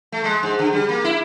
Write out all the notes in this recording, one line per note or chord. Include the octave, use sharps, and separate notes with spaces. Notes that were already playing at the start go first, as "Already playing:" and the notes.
A3
G#3
G#2
D3
G3
A#3
E4